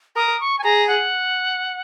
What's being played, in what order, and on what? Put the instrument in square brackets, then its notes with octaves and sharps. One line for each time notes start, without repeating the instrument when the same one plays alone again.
[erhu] A#4 [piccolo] D#6
[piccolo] C#6
G#5
[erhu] G#4 [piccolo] A#5
[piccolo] F#5